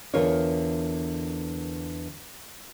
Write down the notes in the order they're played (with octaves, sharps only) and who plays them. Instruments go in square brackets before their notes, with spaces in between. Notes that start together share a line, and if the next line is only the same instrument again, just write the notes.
[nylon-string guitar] E2 D3 F4 A#4 C#5